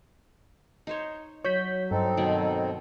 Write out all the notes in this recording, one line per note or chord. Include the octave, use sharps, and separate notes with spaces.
D#4 C5 C#5
F#3 F#4 C#5 G6 B6
G2 C4 D#4 A4
B2 D#3 D5